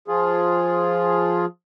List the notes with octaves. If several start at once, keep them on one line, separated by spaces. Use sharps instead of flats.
F3 F4 G#4